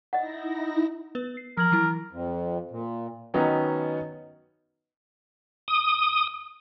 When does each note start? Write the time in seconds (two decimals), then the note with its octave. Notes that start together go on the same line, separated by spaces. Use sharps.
0.13 D#4 E4 D#5 F#5 A#6
1.15 B3 B4
1.37 C7
1.57 F3 A#4 G#6 F#7
1.72 E3 F#3 E4
2.12 F2
2.71 A#2
3.34 D#3 F#3 B3 C#4 D#4
5.68 D#6